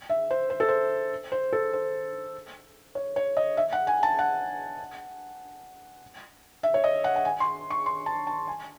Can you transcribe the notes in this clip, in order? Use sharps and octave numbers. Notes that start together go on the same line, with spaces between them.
E5
C5
C5
A4
C5
C5
A4
C5
C#5
C#5
D#5
E5
F#5
G#5
A5
F#5
E5
C#5
D#5
F#5
F#5
G#5
C6
C#6
C6
A5
A5
G#5